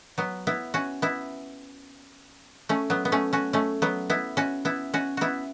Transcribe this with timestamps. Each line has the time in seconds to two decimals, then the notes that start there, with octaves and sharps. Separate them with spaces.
0.18 F#3 B3
0.47 B3 E4
0.74 C#4 F#4
1.02 B3 E4
2.69 A3 C#4
2.90 F#3 B3
3.05 B3
3.12 A3 C#4
3.33 C#4 F#4
3.53 A3 C#4
3.82 F#3 B3
4.10 B3 E4
4.37 C#4 F#4
4.65 B3 E4
4.94 C#4 F#4
5.17 B3 E4 F#4